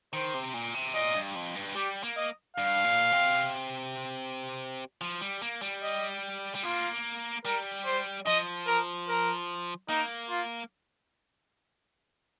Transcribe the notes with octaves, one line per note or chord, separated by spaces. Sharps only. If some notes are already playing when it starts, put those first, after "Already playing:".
D#3 C5
C3
A#2
C3
A#2 D#5
G2
F2
G2
G3 G4
A#3
D#5
G2 F5
A#2
C3
F3
G3
A#3
G3
D#5
G3
A#3 F4
G3 A#4
C5
F3 D#5
A#4
A#4
A#3 D#4
F4